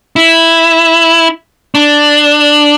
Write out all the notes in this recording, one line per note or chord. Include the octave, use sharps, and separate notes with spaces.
E4
D4